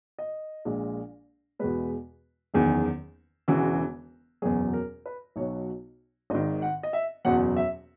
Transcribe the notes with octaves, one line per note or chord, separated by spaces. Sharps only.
D#5
A#1 A#2 G#3
E2 B2 G#3 B4
F#1 E2 D#3 G#4
E1 E2 C#3 E3 F#4
F#1 E2 B2 F#3 G#4
A#4
B4
B1 B2 F#3 C#5
G#1 G#2 D#3 D#5
F#5
D#5
E5
F#1 E2 B2 F#3 F#5
E5